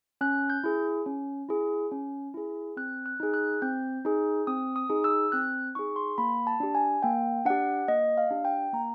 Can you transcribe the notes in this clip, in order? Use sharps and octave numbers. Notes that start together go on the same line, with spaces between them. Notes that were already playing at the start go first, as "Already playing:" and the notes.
C#4 F#6
G6
E4 G#4
C#4
E4 G#4
C#4
E4 G#4
C4 F#6
F#6
D#4 G#4
F#6
C4 G6
D#4 G#4
C4 D#6
D#6
D#4 G#4
E6
C4 F#6
D#4 G#4 C#6
C6
A#3 B5
A5
D4 G4
G#5
A#3 G5
D4 G4 F#5
A#3 D#5
F5
D4 G4
G5
A#3 A#5